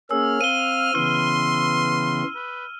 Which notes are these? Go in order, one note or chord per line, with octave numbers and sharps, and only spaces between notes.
A#3 C#4 G#4 E6 F6
C4 F5 D#7 G7
C#3 E3 B3 C6 F6
B4